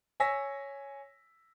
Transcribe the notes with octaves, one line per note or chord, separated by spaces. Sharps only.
C#5 G#5 E6 A#6 B6